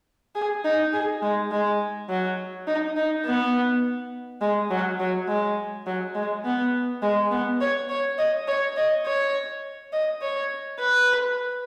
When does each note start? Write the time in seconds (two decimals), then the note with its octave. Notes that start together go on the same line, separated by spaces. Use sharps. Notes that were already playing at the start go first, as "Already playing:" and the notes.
0.35 G#4
0.65 D#4
0.93 G#4
1.23 G#3
1.51 G#3
2.10 F#3
2.67 D#4
2.97 D#4
3.26 B3
4.42 G#3
4.71 F#3
5.00 F#3
5.28 G#3
5.87 F#3
6.15 G#3
6.45 B3
7.03 G#3
7.31 B3
7.61 C#5
7.89 C#5
8.19 D#5
8.48 C#5
8.77 D#5
9.06 C#5
9.93 D#5
10.22 C#5
10.80 B4